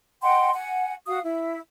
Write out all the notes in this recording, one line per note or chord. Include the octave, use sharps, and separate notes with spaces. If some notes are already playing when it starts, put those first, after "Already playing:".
D#5 F#5 G5 C6
F#5 G#5
F#4 F5 D#6
E4